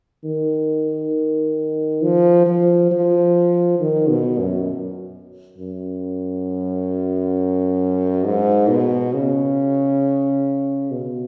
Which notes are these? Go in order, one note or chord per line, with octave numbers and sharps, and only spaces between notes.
D#3
F3
F3
F3
D#3
B2
F#2
F#2
G#2
B2
C#3
B2